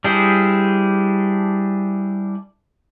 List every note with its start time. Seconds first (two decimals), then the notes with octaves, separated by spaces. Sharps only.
0.04 G3 D4 E4 G#4 C5